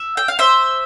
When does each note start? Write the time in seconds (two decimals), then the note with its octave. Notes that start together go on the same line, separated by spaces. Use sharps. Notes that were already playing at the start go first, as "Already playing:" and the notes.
Already playing: E5
0.17 G5
0.28 F5
0.39 C5 E5